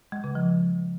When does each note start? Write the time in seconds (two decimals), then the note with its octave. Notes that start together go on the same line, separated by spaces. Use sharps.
0.12 G#3
0.24 C#3
0.35 F3